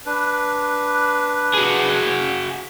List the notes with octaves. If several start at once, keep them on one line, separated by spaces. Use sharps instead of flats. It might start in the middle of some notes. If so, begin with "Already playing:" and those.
D4 B4
F#4 G#4